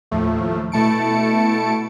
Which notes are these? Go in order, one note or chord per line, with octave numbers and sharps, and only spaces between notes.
D#2 A2 F3 A3
B2 A3 E4 A5 C#7 D7